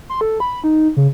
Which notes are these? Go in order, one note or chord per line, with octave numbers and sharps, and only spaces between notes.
C6
A4
B5
D#4
C#3